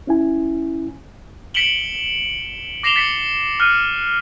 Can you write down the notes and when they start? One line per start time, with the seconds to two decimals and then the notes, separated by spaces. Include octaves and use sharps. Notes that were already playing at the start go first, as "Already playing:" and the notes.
0.07 C#4 E4 G#5
1.54 B6 C#7 D7 E7 F#7 G7
2.83 D6 A#6 C7 E7 F7 G7
2.96 A6 B6 C#7 F#7 G7
3.60 F6 F#6 D#7